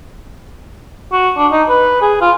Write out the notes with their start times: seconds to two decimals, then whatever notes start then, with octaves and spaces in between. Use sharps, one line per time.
1.12 F#4
1.37 D4
1.52 D#4
1.69 B4
2.02 G#4
2.21 F4